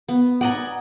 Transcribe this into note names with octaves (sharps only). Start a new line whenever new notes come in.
B3
D5 D#5 F#5 G#5 A#5